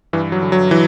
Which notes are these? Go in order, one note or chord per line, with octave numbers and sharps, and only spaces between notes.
G2 E3
F#3
D3
F#3
E3